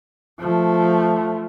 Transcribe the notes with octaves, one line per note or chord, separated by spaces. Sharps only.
F3 A3